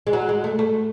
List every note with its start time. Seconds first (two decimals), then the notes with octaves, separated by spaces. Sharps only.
0.07 G#3
0.13 F#3
0.29 G#3
0.44 A3
0.59 A3